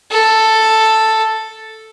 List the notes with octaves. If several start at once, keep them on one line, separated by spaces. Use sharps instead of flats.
A4